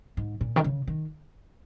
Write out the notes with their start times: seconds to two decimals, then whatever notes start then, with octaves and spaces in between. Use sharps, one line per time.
0.17 G#2
0.41 A#2
0.56 D#3
0.64 C#3
0.87 D#3